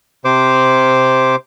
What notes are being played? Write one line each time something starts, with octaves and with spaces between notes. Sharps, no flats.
C3 C5 D6